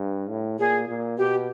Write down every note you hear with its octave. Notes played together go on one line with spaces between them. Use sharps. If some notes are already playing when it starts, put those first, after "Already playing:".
Already playing: G2
A2
A#2 G#4
A#2
B2 G4